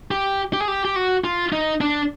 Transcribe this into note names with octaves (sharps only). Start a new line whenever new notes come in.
G4
G4
G#4
G4
G4
F#4
F4
D#4
D4